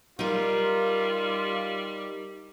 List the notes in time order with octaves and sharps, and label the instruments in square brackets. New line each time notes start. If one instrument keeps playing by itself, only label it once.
[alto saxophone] G3 [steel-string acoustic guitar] D#4 A#4 [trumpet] F4